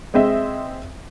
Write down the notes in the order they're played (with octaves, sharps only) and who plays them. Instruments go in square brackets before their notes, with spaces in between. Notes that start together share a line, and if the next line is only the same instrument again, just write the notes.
[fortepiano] G#3 C4 D#5 E5